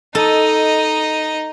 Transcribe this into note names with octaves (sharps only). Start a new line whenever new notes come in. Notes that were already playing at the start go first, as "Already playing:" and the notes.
D#4 A4 D#5